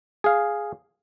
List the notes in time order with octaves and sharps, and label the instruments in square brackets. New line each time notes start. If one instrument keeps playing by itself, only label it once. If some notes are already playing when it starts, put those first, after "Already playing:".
[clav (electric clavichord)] G#4 F5